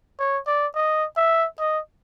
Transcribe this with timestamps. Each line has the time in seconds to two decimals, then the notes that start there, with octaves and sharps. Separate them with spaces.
0.19 C#5
0.47 D5
0.75 D#5
1.17 E5
1.60 D#5